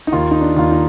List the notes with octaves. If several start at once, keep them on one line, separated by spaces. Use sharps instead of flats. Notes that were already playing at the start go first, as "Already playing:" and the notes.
D#4
D#2 F4
D#4
D4
D#2 F4
D#4